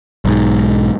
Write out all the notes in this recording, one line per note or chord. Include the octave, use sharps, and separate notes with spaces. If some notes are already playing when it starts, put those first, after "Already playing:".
B1 G#2